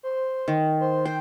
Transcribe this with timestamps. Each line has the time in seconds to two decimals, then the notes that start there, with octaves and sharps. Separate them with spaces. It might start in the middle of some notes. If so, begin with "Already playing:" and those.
0.03 C5
0.48 D#3
0.80 C5
1.06 C5 G5